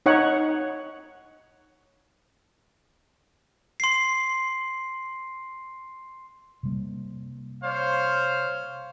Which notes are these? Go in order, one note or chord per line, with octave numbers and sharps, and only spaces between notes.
D#4 C#5 F#5
C6 C7
C3 G3 A#3
C5 C#5 F5